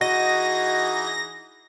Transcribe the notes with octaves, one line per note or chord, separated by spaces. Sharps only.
E3 D#4 F#4 G#4 D#5 A#6